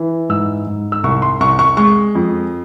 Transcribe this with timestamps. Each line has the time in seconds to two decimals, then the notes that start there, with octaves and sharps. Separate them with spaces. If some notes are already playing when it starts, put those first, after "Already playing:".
Already playing: E3
0.29 G#2 E6
0.67 G#2
0.92 E6
1.04 C2 C#6
1.22 C6
1.40 C2 C#6
1.59 C#6
1.77 G#3 C#6
2.15 F2